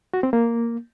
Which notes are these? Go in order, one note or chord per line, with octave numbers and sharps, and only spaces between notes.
F#4
C4
A#3